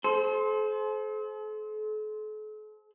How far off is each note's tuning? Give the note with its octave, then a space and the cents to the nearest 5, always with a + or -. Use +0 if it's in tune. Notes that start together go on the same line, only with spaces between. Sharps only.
A4 -45 C5 +0